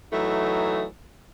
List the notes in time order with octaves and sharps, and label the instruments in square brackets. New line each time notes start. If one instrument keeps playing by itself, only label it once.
[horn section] E3 F#3 A3 D#4